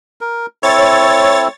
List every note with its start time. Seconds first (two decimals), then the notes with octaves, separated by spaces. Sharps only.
0.21 A#4
0.63 C4 E4 A4 C#5 A6